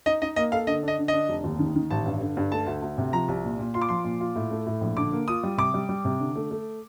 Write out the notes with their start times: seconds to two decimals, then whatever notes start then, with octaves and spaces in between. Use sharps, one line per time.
0.06 D#4 D#5
0.22 D#4 D#5
0.36 A#3 D#5
0.52 A4 F5
0.67 D3 D#5
0.83 D4 D#5
0.99 D3
1.08 D4 D#5
1.29 F1
1.44 D#2
1.59 D#3
1.75 D#3
1.90 A1 A5
2.06 G2
2.21 D3
2.37 G2
2.52 A3 A5
2.66 D2
2.82 D2
2.98 C3
3.13 F3 A#5
3.28 C2
3.44 A#2
3.59 A#2
3.74 F4 C6
3.81 D6
3.89 F3 C6
4.04 A#2
4.21 F4
4.36 A2
4.51 A3
4.67 A2
4.81 A#1
4.97 D3 D6
5.12 A#3
5.28 F4 D#6
5.43 G3
5.58 C3 D6
5.74 G3
5.89 G3
6.05 C3
6.20 D3
6.36 A3
6.51 A3